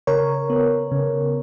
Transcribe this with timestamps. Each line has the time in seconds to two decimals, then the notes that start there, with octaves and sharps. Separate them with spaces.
0.07 C#3 A#4 C#5
0.50 B3
0.92 C#3